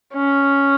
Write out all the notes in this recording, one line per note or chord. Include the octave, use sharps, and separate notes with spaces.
C#4